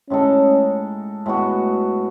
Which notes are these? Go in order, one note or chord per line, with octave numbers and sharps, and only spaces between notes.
A2 G#3 C#4 D#4 A4
A2 G#3 B3 F#4